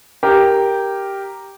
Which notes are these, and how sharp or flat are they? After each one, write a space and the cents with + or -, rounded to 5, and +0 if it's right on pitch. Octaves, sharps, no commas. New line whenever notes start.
G4 +0 A#4 +0